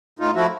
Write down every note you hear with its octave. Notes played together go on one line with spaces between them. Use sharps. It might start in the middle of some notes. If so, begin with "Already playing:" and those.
A2 D#4 F4
F3 A3 E4 F#4